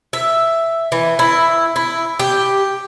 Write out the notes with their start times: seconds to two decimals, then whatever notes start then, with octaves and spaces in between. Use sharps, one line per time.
0.13 E5
0.92 E3
1.19 E4
1.76 E4
2.19 G4